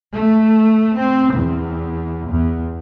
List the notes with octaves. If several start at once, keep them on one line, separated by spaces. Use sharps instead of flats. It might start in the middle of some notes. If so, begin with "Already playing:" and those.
A3
C4
E2
E2